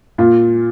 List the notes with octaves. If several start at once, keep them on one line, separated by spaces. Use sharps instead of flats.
A#2 F4